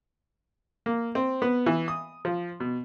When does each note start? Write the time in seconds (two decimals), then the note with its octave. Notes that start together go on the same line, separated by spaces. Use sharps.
0.86 A#3
1.15 C4
1.42 B3
1.66 E3
1.88 D#6
2.25 F3
2.60 B2